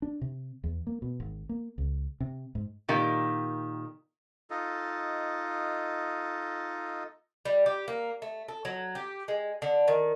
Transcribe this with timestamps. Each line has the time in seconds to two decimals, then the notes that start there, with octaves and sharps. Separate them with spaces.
0.02 D4
0.21 C3
0.64 E2
0.87 A#3
1.02 B2
1.20 G#1
1.49 A#3
1.78 C#2
2.20 C3
2.55 G#2
2.88 A#2 D#3 G4
4.50 D#4 F4 A4 D#5
7.45 G3
7.66 G4
7.88 A#3
8.22 A3
8.48 A4
8.65 F#3
8.95 G4
9.28 G#3
9.62 D3
9.88 D#3